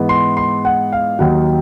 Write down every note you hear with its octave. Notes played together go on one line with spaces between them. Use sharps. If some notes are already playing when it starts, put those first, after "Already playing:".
Already playing: G#2 E3 G#3 B3
C6
C6
F#5
F5
D#2 D#3 F#3 F#5